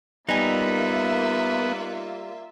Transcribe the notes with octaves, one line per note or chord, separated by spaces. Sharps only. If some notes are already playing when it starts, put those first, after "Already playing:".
G3 A#3 B3 D#4 F4 E5 G#5